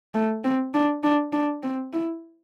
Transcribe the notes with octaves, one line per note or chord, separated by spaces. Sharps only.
A3
C4
D4
D4
D4
C4
E4